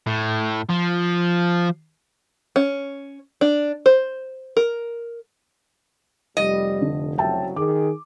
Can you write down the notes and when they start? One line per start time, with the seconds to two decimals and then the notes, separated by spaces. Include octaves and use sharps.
0.07 A2
0.69 F3
2.56 C#4
3.41 D4
3.86 C5
4.57 A#4
6.37 F1 G3 D#5
6.82 D3
7.18 C2 C#3 F#3 E5 G5 A5
7.56 D#3 G#4 D6